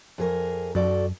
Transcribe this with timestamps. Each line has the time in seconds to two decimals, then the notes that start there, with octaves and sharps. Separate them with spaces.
0.18 F2 G#4 A#4
0.75 F#2 F#4 A4 D5